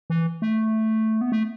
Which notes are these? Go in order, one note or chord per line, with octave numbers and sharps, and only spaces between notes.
E3
A3
B3
A3